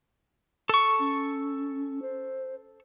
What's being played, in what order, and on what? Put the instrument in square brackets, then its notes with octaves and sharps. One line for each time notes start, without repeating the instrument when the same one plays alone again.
[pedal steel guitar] A4 C#6
[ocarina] C#4
C5